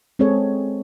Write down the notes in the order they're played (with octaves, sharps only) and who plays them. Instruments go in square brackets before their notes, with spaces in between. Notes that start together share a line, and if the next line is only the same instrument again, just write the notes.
[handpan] G#3 C4 G#4 A4 C#5